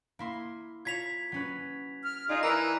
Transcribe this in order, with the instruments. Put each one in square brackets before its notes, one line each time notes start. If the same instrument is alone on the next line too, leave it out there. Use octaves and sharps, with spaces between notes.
[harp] A#3 E4 C6
[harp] F4 C#5 A#5 [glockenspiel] G#6 B6 F7
[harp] F#3 C#4 B4
[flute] F6
[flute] D#4 [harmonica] F4 G#4 [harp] D5
[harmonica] E3 [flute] A#4 [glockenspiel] A#5